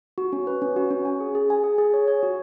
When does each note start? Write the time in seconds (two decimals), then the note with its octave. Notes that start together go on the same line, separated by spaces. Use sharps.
0.18 F#4
0.33 C#4
0.47 B4
0.62 C#4
0.76 F#4
0.91 C#4
1.05 G#5
1.20 G#4
1.35 G#4
1.50 G#5
1.64 G#4
1.78 G#4
1.94 C#5
2.08 C#5
2.23 F#4